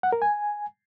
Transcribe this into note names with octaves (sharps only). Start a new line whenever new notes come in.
F#5
A#4
G#5